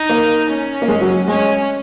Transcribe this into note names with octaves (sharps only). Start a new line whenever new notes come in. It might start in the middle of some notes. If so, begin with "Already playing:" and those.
Already playing: D#4
A#3
C#4
A#3
G#3
F#3
G#3 C#4